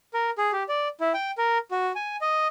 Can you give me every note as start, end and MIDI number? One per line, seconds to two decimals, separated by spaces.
0.14 0.30 70
0.38 0.52 68
0.52 0.63 67
0.69 0.88 74
1.00 1.13 64
1.14 1.31 79
1.38 1.58 70
1.71 1.92 66
1.96 2.16 80
2.21 2.48 75